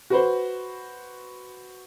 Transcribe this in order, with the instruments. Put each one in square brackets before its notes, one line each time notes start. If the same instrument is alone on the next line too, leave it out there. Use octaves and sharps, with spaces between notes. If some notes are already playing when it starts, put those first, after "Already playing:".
[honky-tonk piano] F#4 B4 C5